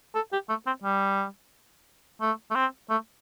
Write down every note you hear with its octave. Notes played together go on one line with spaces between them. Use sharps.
A4
G4
A3
C4
G3
A3
A3
C4
A3